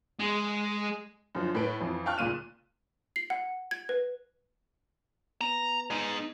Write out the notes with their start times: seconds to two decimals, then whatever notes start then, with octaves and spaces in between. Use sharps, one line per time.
0.20 G#3
1.35 F#2 D3 F3
1.55 A2 A4 B4 D7
1.81 F2 E3
2.06 F5 G5 A5 C#6 F6 F#6
2.18 C#2 A#2 D#7 E7
3.16 C7
3.30 F#5
3.71 G#6
3.89 B4
5.41 B3 A#5
5.90 G#3 D#4